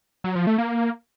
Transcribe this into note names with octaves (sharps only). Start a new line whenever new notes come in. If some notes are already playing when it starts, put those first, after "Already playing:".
F#3
F3
A3
A#3